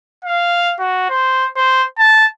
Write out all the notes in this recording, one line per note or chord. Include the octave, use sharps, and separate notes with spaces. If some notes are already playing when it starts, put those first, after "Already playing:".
F5
F#4
C5
C5
A5